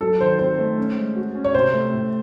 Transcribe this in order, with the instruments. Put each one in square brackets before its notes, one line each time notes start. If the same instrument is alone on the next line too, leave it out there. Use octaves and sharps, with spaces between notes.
[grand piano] F#3 [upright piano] A4
[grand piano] D#3 [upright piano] C5
[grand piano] C4 [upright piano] C5
[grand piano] A3
C#4
G#3
F#4
C#4
[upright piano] C#5
[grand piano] C3 [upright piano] C5
[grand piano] A3
A2